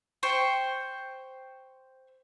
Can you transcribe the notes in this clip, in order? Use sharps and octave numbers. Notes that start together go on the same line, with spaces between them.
C5 G5 C#6